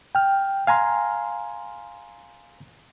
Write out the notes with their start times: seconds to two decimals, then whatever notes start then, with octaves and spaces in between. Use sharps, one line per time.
0.15 G5 F6
0.67 F5 G#5 A#5 C6 F6